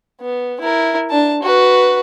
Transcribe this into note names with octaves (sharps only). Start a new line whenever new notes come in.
B3
E4 A#4
D4 A5
F#4 B4